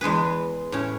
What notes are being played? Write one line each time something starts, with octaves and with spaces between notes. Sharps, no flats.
E2 G#3 G#4 B4
A2 C#4